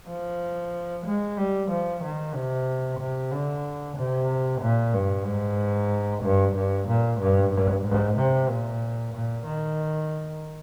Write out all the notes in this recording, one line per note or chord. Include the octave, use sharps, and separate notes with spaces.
F3
G#3
G3
F3
D#3
C3
C3
D3
C3
A#2
G2
G#2
G2
G2
A#2
G2
G2
G#2
C3
A#2
A#2
D#3